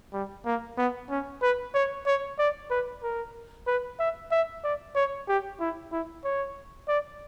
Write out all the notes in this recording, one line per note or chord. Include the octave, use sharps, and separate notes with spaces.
G3
A#3
B3
C#4
B4
C#5
C#5
D5
B4
A#4
B4
E5
E5
D5
C#5
G4
E4
E4
C#5
D5